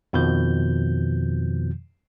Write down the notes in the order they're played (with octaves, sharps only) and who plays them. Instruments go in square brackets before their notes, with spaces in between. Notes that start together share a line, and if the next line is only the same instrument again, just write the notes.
[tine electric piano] F2 B2 D#3 F3 G6